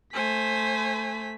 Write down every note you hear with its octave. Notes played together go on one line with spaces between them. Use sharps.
A3 C5 G#5 B6